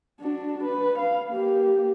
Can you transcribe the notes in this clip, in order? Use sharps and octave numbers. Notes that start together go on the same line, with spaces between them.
D4 F#4
B4
F5
A#3 G4